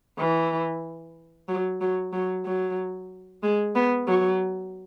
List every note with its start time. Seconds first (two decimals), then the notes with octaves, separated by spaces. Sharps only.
0.19 E3
1.48 F#3
1.81 F#3
2.13 F#3
2.46 F#3
3.43 G#3
3.75 B3
4.08 F#3